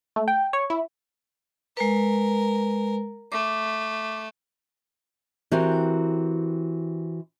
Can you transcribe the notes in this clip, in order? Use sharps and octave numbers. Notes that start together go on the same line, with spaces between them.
A3
G5
C#5
E4
G#3 A#4 B4
A3 D6
E3 C4 F#4 G4 A#4